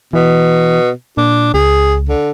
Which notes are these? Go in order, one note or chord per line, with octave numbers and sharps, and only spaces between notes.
B2 E3
A#2 D4
C#2 G#4
D3